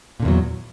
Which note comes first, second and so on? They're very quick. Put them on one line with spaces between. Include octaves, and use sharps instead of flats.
A#2 D3 E2 F#3